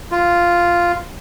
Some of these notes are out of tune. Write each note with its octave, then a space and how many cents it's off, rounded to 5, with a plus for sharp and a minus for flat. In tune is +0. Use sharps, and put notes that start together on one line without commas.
F4 -5